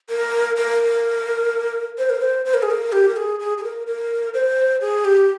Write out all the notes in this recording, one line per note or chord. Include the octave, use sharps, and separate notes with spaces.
A#4
A#4
C5
A#4
C5
C5
A#4
G#4
A#4
G4
A#4
G#4
G#4
G#4
A#4
A#4
C5
G#4
G4